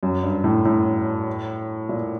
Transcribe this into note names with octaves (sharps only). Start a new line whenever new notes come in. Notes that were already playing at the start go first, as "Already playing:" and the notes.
F#2
G2
A2
A2
A#2